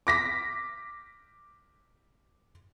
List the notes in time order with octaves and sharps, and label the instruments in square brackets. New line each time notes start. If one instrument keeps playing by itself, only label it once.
[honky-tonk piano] D6 A#6 B6